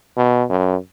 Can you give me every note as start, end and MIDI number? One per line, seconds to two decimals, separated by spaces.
0.16 0.44 47
0.49 0.76 42